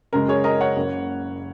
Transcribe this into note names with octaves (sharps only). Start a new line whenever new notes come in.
F#2 C#3 G#3 A#4
G#4 C#5
A#4 D#5
C#5 F#5
F#1 F#2 C#3 A#3